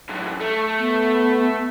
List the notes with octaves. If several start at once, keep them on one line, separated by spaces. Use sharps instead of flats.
F#2 A2
A3
B3